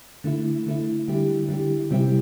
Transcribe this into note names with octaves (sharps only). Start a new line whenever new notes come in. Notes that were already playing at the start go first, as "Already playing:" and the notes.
D3 A3 E4
D3 A3 E4
D3 G3 E4 G4
D3 G3 E4 G4
C3 G3 C4 E4 G4